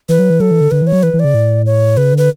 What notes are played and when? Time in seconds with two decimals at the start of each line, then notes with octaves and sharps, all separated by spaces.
0.09 E3 B4
0.19 F#3
0.30 E3
0.40 F#3 A4
0.51 E3
0.61 D3
0.71 D3 B4
0.82 E3 C#5
0.92 F#3
1.03 E3 B4
1.13 E3
1.19 D5
1.25 C#3
1.34 A2
1.66 C#5
1.97 C#3 B4
2.13 D3 B4